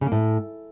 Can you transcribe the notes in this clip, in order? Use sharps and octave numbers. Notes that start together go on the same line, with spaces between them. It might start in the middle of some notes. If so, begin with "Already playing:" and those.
C#3
A#3
A2